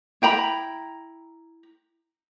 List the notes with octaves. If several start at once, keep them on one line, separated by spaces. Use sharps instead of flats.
E4 G5 A#5 B5